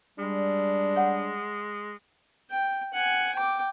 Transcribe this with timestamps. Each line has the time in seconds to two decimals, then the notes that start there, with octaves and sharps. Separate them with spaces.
0.19 G3 G#3 D4
0.96 C#5 F#5
2.51 G5
2.94 F#5 G#5
3.35 G5 D6